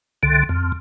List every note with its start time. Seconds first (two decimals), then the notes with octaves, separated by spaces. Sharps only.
0.23 C2 D3
0.49 F2